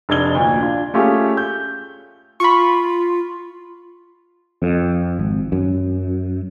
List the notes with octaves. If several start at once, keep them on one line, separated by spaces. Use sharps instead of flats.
F1 D4 D#4 G#6 G7
D2 A#2
D4 F4
A3 C#4 F4 G4 G#4
G6
F4 B5 C#6
F2
G#1
F#2